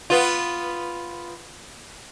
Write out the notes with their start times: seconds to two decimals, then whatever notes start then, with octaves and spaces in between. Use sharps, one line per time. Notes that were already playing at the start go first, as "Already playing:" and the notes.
0.10 B3 F4